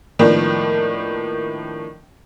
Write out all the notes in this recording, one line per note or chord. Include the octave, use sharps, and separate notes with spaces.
A2 D#3 F3 A#3 B3 D4